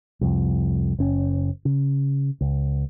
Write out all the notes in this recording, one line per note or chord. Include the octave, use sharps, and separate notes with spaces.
C2 F2
F#1 C#4
C#3
C#2